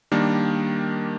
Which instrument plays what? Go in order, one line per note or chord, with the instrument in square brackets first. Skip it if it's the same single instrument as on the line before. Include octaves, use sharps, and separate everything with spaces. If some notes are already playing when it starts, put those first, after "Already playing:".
[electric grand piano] D#3 G3 A#3 D4